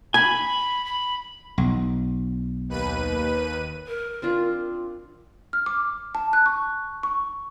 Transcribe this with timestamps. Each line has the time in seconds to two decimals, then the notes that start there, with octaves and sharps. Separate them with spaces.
0.14 G#5 B5
0.86 B5
1.58 B1
2.69 D#2 B4 D#7
3.88 A#4
4.22 C4 D4 F4
5.53 F6
5.66 D6
6.15 A5
6.33 F#6
6.46 C#6
7.03 C#6